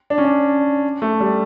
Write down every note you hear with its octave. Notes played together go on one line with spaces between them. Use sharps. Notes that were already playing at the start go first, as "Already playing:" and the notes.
D4
C#4
D4
A3
G3